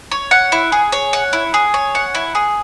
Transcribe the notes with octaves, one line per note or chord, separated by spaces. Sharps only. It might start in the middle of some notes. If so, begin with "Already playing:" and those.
C#5
F#5
E4
G#4
C#5
F#5
E4
G#4
C#5
F#5
E4
G#4